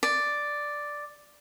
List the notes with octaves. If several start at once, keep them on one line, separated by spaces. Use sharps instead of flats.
D5